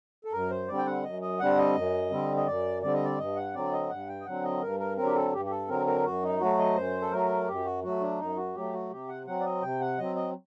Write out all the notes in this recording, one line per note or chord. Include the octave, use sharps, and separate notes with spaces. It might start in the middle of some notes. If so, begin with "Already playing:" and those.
A4
F#2 A#4
C5
D3 G3 C4 D5
G5
F#5
F#2 D#5
D#5
D3 G3 C4 F#5
D#5
F#2
D3 G3 C4
D#5
F#2 D5
D3 G3 C4 D5
D#5
D5
G2 D#5
F#5
D3 F#3 C4 D5
D#5
G2 F#5
G5
D#5
D3 F#3 C4 F#5
D#5
G2 A#4
A#4
D3 F#3 C4 A#4
G4
A4
G2 G4
G4
A4
D3 F#3 C4 A#4
A#4
F#2 F#4
D#4
F#3 A3 F#4
D#5
F#2 C5
A4
F#3 A3 A#4
F#2 G4
F#4
F#3 A3 F#4
D4
F#2 D#4
F#4
F#3 A3 G4
F#4
C3 G4
F#5
F#3 C4 F#5
D5
D#5
C3 G5
F#5
F#3 C4 D#5
D#5